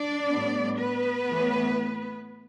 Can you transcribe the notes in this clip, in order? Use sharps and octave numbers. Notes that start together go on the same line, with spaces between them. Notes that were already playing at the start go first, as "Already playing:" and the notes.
Already playing: D4 D5
A2 G3 B3
B3 B4
A2 E3 A3